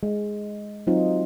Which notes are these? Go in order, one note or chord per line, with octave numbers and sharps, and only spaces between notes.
G#3
F#3 C4 D#4 F4